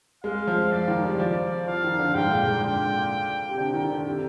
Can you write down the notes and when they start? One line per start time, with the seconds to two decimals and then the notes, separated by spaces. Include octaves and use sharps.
0.24 G#3 F5
0.47 F3
0.71 F3 D5
0.88 D#3
1.04 G3
1.20 F3 D5
1.67 F3 F5
1.84 D#3
1.99 D3
2.15 G#2 G5
2.31 A#2
2.47 G#2
2.62 D3 G5
3.49 C3
3.58 D3 G5
3.74 D#3
3.90 D3
4.06 C3